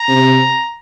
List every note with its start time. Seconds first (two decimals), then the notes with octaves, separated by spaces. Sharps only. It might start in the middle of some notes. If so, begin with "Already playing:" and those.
Already playing: A#5
0.08 C3